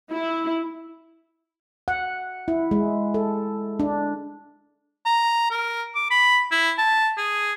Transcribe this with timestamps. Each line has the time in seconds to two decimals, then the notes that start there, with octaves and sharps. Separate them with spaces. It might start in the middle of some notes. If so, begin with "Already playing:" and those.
0.12 E4
1.88 F#5
2.48 E4
2.71 G#3
3.14 A4
3.80 D4
5.05 A#5
5.51 A#4
5.95 D6
6.10 B5
6.51 E4
6.78 A5
7.17 G#4